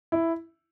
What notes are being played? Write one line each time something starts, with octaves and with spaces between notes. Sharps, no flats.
E4